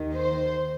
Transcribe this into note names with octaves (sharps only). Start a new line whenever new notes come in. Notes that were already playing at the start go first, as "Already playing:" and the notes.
Already playing: D#2 D#3
C5